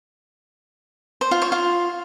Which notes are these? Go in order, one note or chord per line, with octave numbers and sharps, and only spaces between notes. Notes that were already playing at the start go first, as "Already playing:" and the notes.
C5
F4
C#5
F4